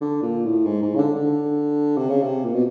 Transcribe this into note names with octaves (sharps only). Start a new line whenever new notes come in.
D3
A#2
A2
G#2
G#2
C#3
D3
D3
C3
C#3
C3
A#2
B2